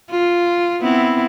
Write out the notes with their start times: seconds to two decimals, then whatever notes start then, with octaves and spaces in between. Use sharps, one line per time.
0.10 F4
0.81 B3 C4 E4